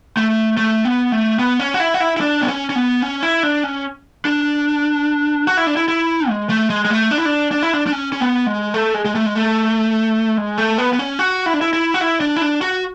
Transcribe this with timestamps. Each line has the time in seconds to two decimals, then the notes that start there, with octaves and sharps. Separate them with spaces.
0.17 A3
0.57 A3
0.85 B3
1.12 A3
1.39 B3
1.60 C#4
1.74 F#4
1.80 E4
1.94 F#4
2.00 E4
2.17 E4
2.21 D4
2.41 B3
2.48 C#4
2.70 C#4
2.75 B3
3.02 C#4
3.23 E4
3.43 D4
3.64 C#4
4.25 D4
5.47 F#4
5.57 E4
5.67 D4
5.77 E4
5.88 E4
6.29 G#3
6.49 A3
6.70 G#3
6.85 G#3
6.90 A3
7.11 D4
7.18 E4
7.25 D4
7.52 D4
7.62 E4
7.73 D4
7.87 D4
7.92 C#4
8.12 C#4
8.20 B3
8.47 G#3
8.74 A3
8.94 G#3
9.05 G#3
9.15 A3
9.26 G#3
9.35 A3
10.37 G#3
10.58 A3
10.78 B3
10.93 B3
10.99 C#4
11.19 F#4
11.46 E4
11.54 D4
11.61 E4
11.73 E4
11.94 F#4
12.01 E4
12.20 D4
12.36 E4
12.41 D4
12.61 F#4